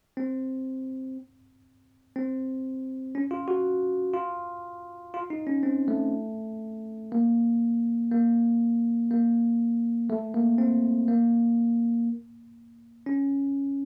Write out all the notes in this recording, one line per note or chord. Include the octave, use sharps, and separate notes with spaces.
C4
C4
C#4
F4
F#4
F4
F4
D#4
C#4
C4
A3
A#3
A#3
A#3
A3
A#3
C4
A#3
C#4